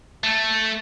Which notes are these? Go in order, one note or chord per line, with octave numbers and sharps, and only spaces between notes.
A3